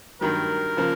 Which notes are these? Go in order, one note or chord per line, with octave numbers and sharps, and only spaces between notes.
G2 D#3 F#3 A#4
C#3 F3 A#3